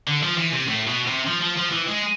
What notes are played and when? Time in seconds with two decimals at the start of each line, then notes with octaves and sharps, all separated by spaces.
0.07 D3
0.23 F3
0.37 E3
0.53 C3
0.68 A2
0.88 B2
1.07 C3
1.27 F3
1.42 F3
1.57 F3
1.72 E3
1.87 G#3